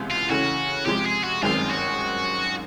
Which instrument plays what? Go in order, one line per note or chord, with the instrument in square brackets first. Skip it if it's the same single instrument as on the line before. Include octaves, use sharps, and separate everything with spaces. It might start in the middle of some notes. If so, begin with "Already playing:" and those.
Already playing: [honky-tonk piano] C#2 C3 E3 G#3 B3
[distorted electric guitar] F4
[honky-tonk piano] C#3 E3 A3 C#4 [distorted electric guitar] F#4
[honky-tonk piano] C3 F3 G#3 [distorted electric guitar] G4
[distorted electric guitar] G#4
F#4
[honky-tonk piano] G1 F#2 D#3 G#3 C4 [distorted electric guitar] F4
[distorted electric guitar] F#4